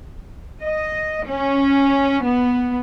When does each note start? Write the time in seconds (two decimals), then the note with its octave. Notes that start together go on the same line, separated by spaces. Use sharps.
0.62 D#5
1.26 C#4
2.23 B3